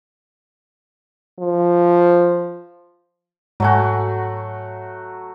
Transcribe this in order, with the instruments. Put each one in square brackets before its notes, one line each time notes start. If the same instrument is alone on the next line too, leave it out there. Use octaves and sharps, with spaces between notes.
[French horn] F3
[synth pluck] G#2 G#5 [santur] F#3 A3 F#4